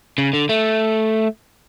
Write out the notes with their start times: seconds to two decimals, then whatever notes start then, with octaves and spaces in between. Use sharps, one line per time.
0.18 C#3
0.33 D3
0.49 A3